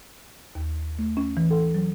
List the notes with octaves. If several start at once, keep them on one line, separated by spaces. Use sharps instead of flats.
D#2
A3
C#4
E3
A4
F#3